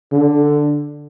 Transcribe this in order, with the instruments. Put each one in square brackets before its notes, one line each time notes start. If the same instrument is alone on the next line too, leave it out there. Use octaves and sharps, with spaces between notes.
[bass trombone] D3